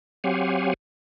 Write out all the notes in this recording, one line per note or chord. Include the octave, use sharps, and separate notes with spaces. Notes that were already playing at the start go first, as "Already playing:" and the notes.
F#3 C4 G4 F5 F#5 G#5